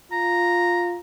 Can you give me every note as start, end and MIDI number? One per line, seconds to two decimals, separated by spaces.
0.12 0.99 65
0.12 0.99 82